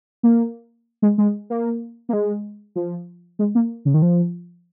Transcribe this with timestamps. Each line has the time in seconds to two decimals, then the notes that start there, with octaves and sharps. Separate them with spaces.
0.23 A#3
1.02 G#3
1.18 G#3
1.50 A#3
2.09 A#3
2.13 G#3
2.76 F3
3.39 G#3
3.55 A#3
3.85 C#3
3.94 D#3
4.02 F3